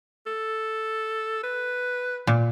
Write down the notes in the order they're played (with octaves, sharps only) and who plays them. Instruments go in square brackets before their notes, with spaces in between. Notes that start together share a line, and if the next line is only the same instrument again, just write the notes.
[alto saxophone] A4
B4
[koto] A#2